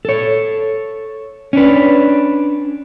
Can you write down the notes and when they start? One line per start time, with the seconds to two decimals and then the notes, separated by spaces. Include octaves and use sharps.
0.05 A4 C#5
1.53 C#4 D4 B4